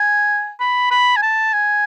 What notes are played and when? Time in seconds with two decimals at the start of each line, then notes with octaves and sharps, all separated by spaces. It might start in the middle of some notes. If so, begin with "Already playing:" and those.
Already playing: G#5
0.60 B5
0.91 B5
1.17 G#5
1.23 A5
1.53 G#5